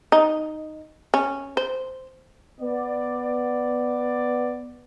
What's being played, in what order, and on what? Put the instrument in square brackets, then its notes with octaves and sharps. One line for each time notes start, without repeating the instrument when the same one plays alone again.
[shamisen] D#4
C#4
C5
[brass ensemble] B3 D5